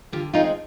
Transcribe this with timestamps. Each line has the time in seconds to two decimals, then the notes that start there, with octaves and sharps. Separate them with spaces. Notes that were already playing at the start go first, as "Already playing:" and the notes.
0.12 D3 F4 G4
0.33 F3 G#3 C4 D#4 F4